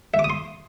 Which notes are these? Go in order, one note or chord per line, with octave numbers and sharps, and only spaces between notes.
E5
D6
D#6
C6